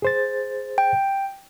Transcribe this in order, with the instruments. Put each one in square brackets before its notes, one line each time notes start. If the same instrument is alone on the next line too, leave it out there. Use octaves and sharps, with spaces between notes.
[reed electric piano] G#4 C5 A6
[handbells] G5